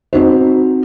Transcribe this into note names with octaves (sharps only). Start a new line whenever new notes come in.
C4 D#4 F#4 C5